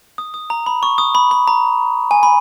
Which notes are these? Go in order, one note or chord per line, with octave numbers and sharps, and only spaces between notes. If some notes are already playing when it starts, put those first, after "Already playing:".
D#6
D#6
A#5
B5
C#6
D#6
B5
B5
A#5
G#5
B5